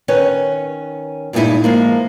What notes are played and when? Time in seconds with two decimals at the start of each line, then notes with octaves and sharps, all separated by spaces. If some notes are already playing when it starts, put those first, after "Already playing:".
0.08 D#3 C#4 B4 C#5
1.33 G2 A#2 G#3 B3 D#4 E4
1.64 F3 G#3 A#3